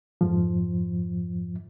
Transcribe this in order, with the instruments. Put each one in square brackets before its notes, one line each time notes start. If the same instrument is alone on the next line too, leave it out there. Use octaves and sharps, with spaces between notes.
[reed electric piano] F2 G#2 F3